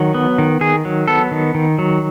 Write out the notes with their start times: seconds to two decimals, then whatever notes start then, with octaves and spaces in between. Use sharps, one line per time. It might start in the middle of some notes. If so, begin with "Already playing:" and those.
Already playing: D#3 F#3
0.14 B3
0.38 D#3
0.61 D#3 G#4
0.85 F#3
1.08 B3 A4
1.32 D#3
1.55 D#3
1.79 F#3